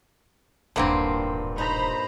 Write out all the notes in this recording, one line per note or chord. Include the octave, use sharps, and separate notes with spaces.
D#1 A1 G2 A#2 D3 A#3 C4 G#5
D#4 C5 A#5 B5